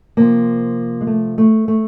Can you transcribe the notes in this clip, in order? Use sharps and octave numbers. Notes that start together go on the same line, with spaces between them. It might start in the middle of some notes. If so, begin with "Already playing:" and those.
C3 F3 A#3
G#3
A3
A3
A3